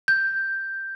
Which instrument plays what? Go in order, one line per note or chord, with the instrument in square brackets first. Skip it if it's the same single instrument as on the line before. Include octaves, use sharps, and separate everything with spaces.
[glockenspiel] G6